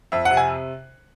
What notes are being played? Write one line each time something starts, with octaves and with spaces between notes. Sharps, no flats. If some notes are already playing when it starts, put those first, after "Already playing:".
F2 E5
F#5
C3
G#5